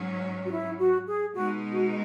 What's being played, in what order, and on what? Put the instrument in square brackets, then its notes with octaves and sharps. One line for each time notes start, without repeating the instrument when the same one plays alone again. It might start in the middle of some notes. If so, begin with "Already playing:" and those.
Already playing: [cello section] G#2 F#3 C#4
[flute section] F#4
E4
F#4
G#4
[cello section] B2 G#3 D#4 [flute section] F#4
[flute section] F#4